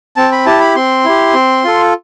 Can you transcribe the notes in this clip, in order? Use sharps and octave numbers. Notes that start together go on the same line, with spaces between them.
C4 A5
B5
E4 G4 A5
B5
C4 C6
E4 G4
C4
F4 A4